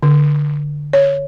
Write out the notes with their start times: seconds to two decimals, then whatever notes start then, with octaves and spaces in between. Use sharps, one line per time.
0.03 D3
0.93 C#5